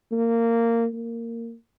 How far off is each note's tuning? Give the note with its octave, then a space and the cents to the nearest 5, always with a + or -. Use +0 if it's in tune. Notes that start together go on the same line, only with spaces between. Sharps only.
A#3 -15
A#3 -15